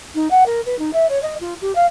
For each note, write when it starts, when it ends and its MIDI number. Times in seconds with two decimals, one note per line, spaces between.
0.15 0.28 63
0.31 0.44 78
0.46 0.61 70
0.66 0.77 71
0.79 0.93 63
0.93 1.06 76
1.09 1.21 73
1.23 1.35 75
1.41 1.54 65
1.61 1.75 67
1.75 1.86 77